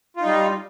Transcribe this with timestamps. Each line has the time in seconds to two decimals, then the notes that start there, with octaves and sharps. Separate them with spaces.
0.17 F4
0.21 D#4
0.25 G3